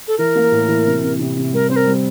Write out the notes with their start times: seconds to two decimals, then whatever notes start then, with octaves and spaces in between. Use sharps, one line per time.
0.07 A4
0.18 E3 A#4
0.35 A#3
0.52 A2
0.68 E3
0.86 C3
1.02 C3
1.20 C3
1.36 C3
1.53 G3 A#4
1.69 C4 C5
1.76 A#4
1.87 G3